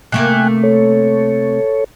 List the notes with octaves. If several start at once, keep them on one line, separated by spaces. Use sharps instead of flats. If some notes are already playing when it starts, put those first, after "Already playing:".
C3 A3 A#3 G5 G#5 F#6
A4 C#5